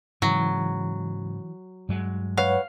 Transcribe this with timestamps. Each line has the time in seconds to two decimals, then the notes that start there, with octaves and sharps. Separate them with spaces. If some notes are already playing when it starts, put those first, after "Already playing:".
0.22 G#2 C#3 E3 F#3
1.89 G2 F#3 G#3
2.37 B4 C#5 F5 F#5